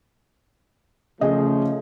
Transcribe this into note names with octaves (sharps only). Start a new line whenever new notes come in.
C#3 F3 A3 G#4 D#5